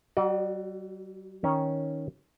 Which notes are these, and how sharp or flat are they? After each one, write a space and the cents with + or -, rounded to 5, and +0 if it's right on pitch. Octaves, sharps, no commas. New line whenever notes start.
G3 -45 F#4 +0 D5 +35
D#3 +10 C#4 +0